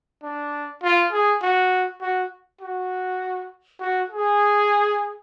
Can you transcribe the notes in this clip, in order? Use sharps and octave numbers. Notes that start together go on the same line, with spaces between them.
D4
F4
G#4
F#4
F#4
F#4
F#4
G#4